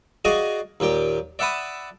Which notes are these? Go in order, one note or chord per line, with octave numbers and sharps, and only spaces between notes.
F#4 G#4 D5 D#5 F5 G#5
D#2 A#2 G4 G5
D5 E5 F#5 A5 B5 D#6